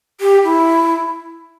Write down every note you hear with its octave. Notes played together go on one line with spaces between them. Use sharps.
G4
E4